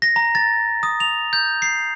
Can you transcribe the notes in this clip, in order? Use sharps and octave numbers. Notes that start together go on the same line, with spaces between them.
A#6
A#5
A6
D#6
F7
G6
C7